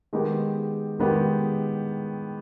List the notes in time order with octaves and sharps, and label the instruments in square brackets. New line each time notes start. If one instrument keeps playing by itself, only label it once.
[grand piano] D#3 G#3 B3 G4
D#3 G#3 B3 G4